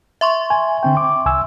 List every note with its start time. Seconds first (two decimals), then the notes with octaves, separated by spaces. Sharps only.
0.21 E5 C6 C#6
0.50 G#5
0.83 D3 C4 G5
0.97 D6
1.26 C2 G#5 E6